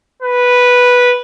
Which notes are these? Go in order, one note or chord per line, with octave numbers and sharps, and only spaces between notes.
B4